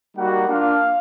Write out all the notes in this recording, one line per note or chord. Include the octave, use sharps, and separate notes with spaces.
G3 A#3 D#4 F#4 F#5
A#3 D4 F4 F5